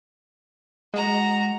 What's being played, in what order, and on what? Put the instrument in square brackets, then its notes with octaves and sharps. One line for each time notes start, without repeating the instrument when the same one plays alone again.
[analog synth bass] G#3 [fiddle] F#4 A#5